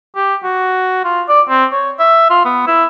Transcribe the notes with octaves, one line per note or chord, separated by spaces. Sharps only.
G4
F#4
F4
D5
C4
C#5
E5
F4
B3
E4